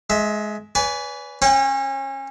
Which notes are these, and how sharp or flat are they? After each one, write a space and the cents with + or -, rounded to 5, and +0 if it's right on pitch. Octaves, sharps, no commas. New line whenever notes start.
G#3 +20 E5 +0
B4 +0 D5 -45 G#5 +0
C#4 -35 C#5 -30 G5 +0